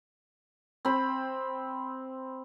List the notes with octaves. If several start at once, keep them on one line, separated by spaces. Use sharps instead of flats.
C4 B5